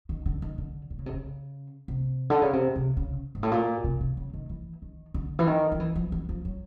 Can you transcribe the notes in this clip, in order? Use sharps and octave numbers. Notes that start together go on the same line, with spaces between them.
D#3
D3
D#3
D3
D3
C#3
C3
C#3
C3
D3
C#3
C3
C3
C#3
G#2
A2
A#2
C3
C3
C#3
D#3
E3
D#3
D3
E3
D#3
F3
E3
F3
E3
F3
F#3